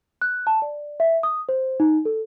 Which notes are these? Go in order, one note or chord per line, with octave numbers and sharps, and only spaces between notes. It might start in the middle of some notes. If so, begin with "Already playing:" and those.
F#6
A5
D5
E5
D#6
C5
D#4
A4